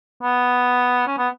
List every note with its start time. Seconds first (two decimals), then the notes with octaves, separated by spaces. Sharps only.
0.23 B3
1.07 C#4
1.18 B3